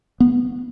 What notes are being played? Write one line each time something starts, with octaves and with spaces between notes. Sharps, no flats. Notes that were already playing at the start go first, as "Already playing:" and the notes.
B3